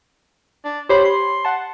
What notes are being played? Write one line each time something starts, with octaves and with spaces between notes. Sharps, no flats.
D4
G4 C5 C#5 B5
C6
F#5 A5